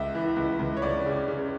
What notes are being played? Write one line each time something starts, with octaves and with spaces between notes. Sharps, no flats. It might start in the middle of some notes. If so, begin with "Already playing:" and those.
Already playing: C#2 E5
E3
C#2
C#2
C#5
C#2 D5
C#3
C#3